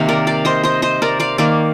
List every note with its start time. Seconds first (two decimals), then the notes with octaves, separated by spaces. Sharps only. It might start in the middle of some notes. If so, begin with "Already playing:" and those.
Already playing: C3 D#3 A#3 F5
0.09 A#4 D5
0.27 D5 F5
0.45 C5 D#5
0.64 C5 D#5
0.82 C5 D#5
1.02 A#4 D5
1.20 D5 F5
1.38 D#3 A#3 D5 F5